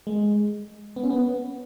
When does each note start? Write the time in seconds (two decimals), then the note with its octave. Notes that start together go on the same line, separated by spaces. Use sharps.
0.07 G#3
0.96 B3
1.03 C#4
1.10 B3